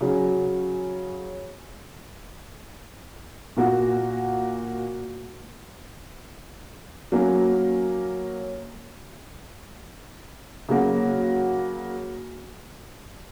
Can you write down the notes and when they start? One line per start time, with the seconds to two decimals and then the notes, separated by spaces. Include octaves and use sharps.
0.01 C#3 F#3 C#4
3.57 A#2 A#3 F#4
7.12 F#3 A#3 C#4
10.69 C#3 F#3 A#3 F#4